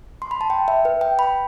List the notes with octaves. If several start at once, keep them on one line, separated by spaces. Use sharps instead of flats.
C6
B5
A5
G5
E5
B4
G5
B5